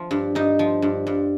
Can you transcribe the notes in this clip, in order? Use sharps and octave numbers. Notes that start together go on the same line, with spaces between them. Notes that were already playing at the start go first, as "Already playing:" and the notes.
Already playing: F3
G2
G2 D#4
F3
G2
G2